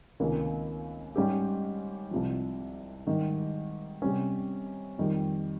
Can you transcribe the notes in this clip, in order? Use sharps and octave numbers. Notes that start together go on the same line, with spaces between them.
C#2 C3 D#3 A#3 C#4
G#2 G3 C#4 G4
C2 C3 F3
G#2 D#3 G3
C3 G3 C#4
F2 D#3 G3